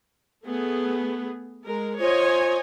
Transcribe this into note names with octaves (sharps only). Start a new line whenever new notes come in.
A3 B3 G#4
G#3 A#4
F4 C5 C#5 D#5 G#5